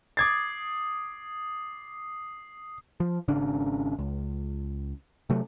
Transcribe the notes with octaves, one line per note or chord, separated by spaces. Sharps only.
D6 D#6 G#6 A6 C7
F3
G#1 C#3 C#4 D4
C#2
C3 F#3 A3